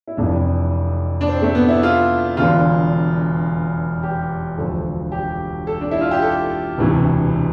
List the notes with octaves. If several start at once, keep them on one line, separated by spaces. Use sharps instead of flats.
E4
F1 F2 C3 E3 D4
D4
C4
A3
B3
E4
F4
E1 E2 D3 F4
G4
E1 D2 D3 F3 A4
G4
A4
D4
E4
F4
G4
A4
E1 D2 C3 E3